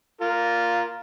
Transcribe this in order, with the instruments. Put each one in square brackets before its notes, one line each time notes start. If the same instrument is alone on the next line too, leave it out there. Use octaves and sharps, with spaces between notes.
[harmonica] F4 A#4